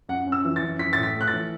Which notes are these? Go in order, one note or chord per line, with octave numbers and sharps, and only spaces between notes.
F#2 F#5
C#4
E6
E3
A6
F#2
E3 B6
A2 A6
B6
A3 F#6
A6
E3